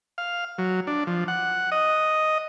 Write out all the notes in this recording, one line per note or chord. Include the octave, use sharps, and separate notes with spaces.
F5
F#3
D4
F3
F#5
D#5